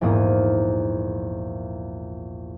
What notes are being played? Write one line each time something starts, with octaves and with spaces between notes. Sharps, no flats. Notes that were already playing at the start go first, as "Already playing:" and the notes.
A#1 E2 G#2 A#3 D#6